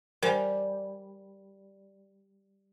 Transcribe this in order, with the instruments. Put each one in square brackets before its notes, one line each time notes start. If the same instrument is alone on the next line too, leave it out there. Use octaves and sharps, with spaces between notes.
[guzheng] G3 [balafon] A#4 C5 G#5